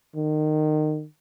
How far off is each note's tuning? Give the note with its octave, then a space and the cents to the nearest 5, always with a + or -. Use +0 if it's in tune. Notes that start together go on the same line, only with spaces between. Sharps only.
D#3 -25